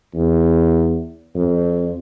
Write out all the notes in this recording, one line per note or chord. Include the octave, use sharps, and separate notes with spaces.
E2
F2